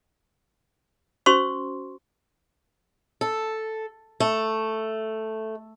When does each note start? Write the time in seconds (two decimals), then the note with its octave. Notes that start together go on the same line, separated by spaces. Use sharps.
1.26 C#4 F#4 C5 C6 C#6 E6
3.21 A4
4.20 A3